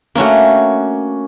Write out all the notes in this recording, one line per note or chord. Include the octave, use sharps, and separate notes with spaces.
A3 A#3 C#4 D4 F#4